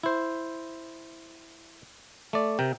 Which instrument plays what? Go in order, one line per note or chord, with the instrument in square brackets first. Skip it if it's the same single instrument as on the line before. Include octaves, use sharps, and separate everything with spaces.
[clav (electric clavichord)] E4 C5
A3 D5
C3 A#4 G5